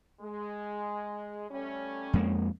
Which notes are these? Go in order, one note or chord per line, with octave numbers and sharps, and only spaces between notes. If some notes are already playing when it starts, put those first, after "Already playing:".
G#3
G3 A3 C#4
F2 G#3 A#3